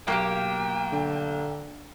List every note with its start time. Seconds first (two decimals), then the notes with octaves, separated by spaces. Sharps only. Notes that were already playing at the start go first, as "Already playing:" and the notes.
0.08 B1 A#3 F#4 G4 G5
0.92 D3